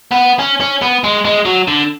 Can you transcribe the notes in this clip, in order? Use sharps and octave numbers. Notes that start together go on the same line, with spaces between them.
B3
C#4
C#4
B3
G#3
G#3
F#3
D3